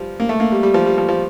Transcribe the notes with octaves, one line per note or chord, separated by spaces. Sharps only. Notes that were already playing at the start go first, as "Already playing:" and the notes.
Already playing: F3 G3
A#3
A3
A#3
G3
G3
F3
G3
F3
F3